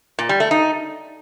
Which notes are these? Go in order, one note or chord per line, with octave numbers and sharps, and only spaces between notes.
A#2
G3
A3
D#4